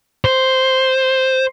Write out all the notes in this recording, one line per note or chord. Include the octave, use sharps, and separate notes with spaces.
C5